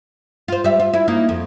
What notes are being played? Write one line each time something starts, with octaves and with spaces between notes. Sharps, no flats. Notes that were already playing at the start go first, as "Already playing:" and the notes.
F4 C5
G3 E5
F4
E4
A#3 D#4 E4
F2